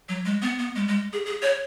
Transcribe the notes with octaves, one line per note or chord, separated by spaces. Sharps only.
F#3
G#3
B3
B3
G#3
G#3
G#4
G#4
C#5